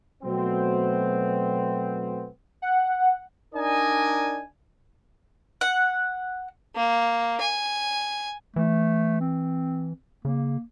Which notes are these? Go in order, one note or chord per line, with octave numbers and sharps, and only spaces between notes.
B2 F#3 A3 B3 C4
F#5
D4 D#4 A#4 D5 D#5 G#5
F#5
A#3
G#5
E3 A3
C4
C#3 A#3